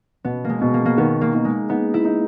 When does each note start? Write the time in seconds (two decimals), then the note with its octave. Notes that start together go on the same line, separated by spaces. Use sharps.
0.24 B2 B3
0.44 G#3 A#3
0.62 B2
0.74 A#3
0.85 A#3
0.98 D#3 B3
1.21 A#3
1.34 D#4
1.45 G#3
1.69 B3 D#4
1.94 E4
2.05 D#4